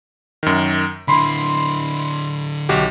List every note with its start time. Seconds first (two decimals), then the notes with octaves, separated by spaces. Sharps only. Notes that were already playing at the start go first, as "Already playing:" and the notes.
0.43 F#2 D#3
1.08 D3 E4 B5 C6
2.69 B1 F#4 G4